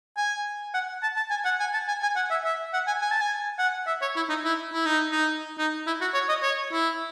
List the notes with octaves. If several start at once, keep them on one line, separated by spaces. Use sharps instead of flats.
G#5
F#5
A5
A5
G#5
F#5
G#5
A5
G#5
G#5
F#5
E5
E5
F#5
G#5
G#5
A5
G#5
F#5
E5
C#5
E4
D#4
E4
E4
D#4
D#4
D#4
E4
F#4
C#5
D#5
C#5
E4